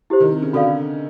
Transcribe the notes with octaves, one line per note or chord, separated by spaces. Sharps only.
E4 G4 C5
D#3
C3
C#3
D3 F#4 A4 D5 F5